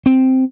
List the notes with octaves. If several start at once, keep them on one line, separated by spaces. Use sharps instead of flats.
C4